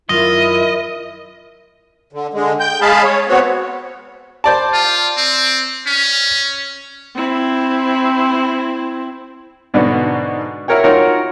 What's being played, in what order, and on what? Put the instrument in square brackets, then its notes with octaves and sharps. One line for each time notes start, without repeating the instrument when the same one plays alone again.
[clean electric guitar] F#2 D#3 F4 [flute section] E4 A#4 E5 [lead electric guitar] D#5
[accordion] D3
D3 G#3
G5 G6
G#3 G#4 F5 A5 B5
C#5
B3 C4 F#4 C#5
[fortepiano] C5 D5 A5
[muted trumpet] F4
C4
C#4
[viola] C4 E4
[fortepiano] G#2 B2 D3 B3 D4 F#4
E4 F#4 A#4 C#5 G5
D#4 F4 F#4 A#4 C#5